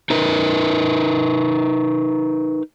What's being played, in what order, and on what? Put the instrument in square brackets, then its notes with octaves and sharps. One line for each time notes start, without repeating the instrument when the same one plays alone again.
[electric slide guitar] D#4 A#4 B4